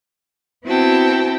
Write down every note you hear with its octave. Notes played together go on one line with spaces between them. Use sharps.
B3 C4 E4 F#4 G5 A5